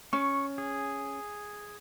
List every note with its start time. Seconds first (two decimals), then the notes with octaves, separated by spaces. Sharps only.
0.13 C#4 C#6
0.58 G#4